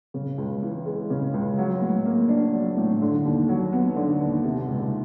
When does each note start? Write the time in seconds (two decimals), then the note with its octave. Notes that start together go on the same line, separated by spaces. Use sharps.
0.14 C#3
0.38 C#2
0.62 E3
0.86 G#3
1.10 C#3
1.34 C#2
1.58 F#3
1.82 A2
2.05 A#3
2.29 D4
2.53 F#3
2.77 A2
3.02 D3
3.25 D#2
3.49 F#3
3.73 B3
3.96 D3
4.20 D#2
4.44 C3
4.68 C#2